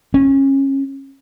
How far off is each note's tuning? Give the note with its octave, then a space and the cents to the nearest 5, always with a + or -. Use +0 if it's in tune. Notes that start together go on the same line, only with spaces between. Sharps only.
C#4 -25